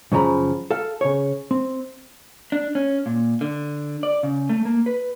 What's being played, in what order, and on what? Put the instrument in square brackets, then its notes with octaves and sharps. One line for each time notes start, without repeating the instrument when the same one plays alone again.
[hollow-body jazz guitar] F#2 C#3 F3 A#5 B5
A4 F5
C#3 C#5
C4
[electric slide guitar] D4
C#4
A#2
D3
D5
C#3
A3
A#3
B4